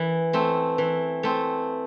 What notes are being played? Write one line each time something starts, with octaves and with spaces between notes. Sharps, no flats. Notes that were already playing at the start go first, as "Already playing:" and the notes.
Already playing: E3
A3 C4
E3
A3 C4